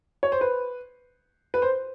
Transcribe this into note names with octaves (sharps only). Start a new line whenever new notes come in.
C#5
C5
B4
B4
C5